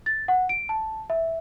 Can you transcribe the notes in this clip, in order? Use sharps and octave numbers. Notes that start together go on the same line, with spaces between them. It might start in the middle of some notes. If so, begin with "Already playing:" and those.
A6
F#5
D7
A5
E5